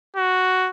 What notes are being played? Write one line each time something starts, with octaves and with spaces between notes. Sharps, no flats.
F#4